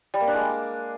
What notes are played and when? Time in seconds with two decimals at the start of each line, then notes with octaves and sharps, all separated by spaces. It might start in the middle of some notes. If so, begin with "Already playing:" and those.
0.14 G3
0.21 A#3
0.27 D4
0.34 G#3